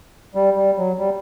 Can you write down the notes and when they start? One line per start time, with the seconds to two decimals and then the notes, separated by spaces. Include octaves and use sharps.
0.35 G3
0.56 G3
0.78 F#3
0.99 G3